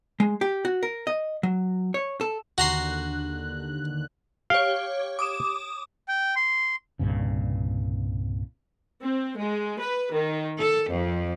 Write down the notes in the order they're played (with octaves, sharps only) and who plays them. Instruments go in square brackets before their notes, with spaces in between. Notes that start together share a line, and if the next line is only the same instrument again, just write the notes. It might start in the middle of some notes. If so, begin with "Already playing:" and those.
[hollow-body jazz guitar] G#3
G4
F#4
A#4
D#5
F#3
C#5
A4
[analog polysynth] D#2 D3 F#6 [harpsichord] F#4 A#5 C6
[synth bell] G4 C#5 [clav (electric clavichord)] F5
[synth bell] D6 D#6 E7
[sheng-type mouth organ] G5
C6
[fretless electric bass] C2 G2 A#2 C#3
[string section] C4
G#3
B4
D#3
A4
F2